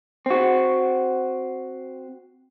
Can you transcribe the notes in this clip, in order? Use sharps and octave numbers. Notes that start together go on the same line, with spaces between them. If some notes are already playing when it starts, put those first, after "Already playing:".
C4 F#4